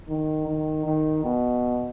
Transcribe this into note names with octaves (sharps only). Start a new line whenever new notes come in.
D#3
D#3
D#3
B2